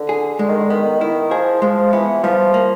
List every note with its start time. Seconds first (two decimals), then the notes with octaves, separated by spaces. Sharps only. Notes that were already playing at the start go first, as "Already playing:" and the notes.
Already playing: D3
0.09 G#4
0.39 D3 G#3
0.49 D#3
0.59 D3
0.70 D#3 B3
1.00 D#3 E4
1.31 F3 G#4
1.62 F3 G#3
1.93 E3 B3
2.24 F3 G3
2.54 A#3